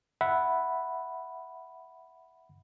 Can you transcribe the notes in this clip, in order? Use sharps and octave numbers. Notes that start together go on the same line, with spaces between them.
E5 F#5 B5